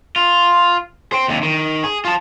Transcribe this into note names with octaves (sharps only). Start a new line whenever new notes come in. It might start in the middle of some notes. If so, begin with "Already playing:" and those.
F4
C5 G5
D#2 C3
D#3
G#4
F4 A5